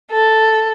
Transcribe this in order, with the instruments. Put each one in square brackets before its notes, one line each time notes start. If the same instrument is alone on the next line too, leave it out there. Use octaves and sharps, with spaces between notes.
[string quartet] A4